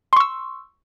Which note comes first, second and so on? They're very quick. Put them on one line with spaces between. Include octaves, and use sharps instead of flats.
C6 C#6 E6